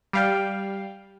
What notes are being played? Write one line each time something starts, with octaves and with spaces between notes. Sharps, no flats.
G3 F5 G5